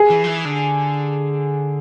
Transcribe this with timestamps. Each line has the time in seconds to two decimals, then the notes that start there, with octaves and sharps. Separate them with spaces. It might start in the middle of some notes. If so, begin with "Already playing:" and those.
Already playing: G#4
0.10 E3
0.24 F3
0.27 E3
0.45 D3